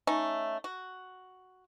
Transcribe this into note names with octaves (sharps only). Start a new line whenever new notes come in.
A3 C#4 D#4
F#4